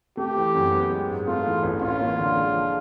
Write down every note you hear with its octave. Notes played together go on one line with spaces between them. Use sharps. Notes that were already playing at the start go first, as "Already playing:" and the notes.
A3 G4
E3
F#2
B3
G#3
G#2
A3 F4
E3
A1
C#4 F4
A#3
D3
G#3
F3